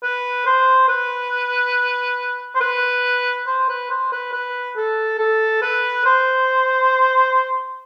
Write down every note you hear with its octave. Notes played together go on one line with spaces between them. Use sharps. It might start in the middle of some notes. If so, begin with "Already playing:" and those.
B4
C5
B4
C5
B4
C5
B4
C5
B4
B4
A4
A4
B4
C5